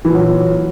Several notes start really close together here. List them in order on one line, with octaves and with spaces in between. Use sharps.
E3 A#2 F#3